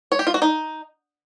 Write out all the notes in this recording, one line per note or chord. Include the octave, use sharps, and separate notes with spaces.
C#5
G4
F4
F#4
D#4